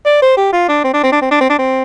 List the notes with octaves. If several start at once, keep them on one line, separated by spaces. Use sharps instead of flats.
D5
C5
G4
F4
D4
C4
D4
C4
D4
C4
D4
C4
D4
C4